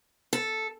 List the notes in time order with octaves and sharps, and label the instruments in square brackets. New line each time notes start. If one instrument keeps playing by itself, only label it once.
[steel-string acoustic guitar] A4